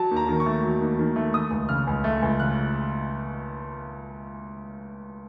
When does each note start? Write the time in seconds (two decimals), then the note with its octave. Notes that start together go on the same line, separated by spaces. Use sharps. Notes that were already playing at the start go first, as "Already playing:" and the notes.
Already playing: F#3 A5
0.11 D#2
0.16 A#5
0.28 D#3
0.40 C#6
0.46 A3
0.63 F#3
0.81 D#2
0.99 D#3
1.16 A3
1.34 A3 D#6
1.51 C#2
1.69 C#3 F6
1.87 C#2
2.04 A3
2.22 C#2
2.40 C#3 F#6